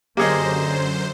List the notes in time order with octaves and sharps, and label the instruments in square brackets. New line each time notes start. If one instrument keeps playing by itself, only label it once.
[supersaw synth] F#2 C5 [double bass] D3 [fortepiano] A#3 G#4 [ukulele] G4 C#5 D#5